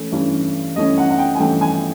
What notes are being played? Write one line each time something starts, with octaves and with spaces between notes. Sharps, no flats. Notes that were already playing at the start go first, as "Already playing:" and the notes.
Already playing: E3 A3 C#4
G2 E3 A3 C#4
G2 E3 A3 C#4 D#5
F#5
F#5
G5
G#5
G2 E3 A3 C#4 G5
G#5